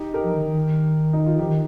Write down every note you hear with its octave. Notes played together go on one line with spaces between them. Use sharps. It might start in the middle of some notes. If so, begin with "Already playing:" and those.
Already playing: D#4 G4
G4 A#4
F3
D#3
D#3
D#4
F4
F3 D#4 G4
D#3